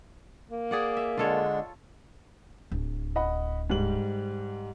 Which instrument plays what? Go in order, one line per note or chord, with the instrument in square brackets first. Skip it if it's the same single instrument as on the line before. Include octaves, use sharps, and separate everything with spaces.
[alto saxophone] A#3
[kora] G#4 D5 F#5
E5
[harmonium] D3 G#3 D4 [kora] F4 A4 C#5
[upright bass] D1 D2
[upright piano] D#5 F#5 B5
G#2 G3 F#7